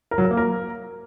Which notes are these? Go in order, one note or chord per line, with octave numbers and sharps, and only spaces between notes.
A#4
F#3
A#4
A#3
A#4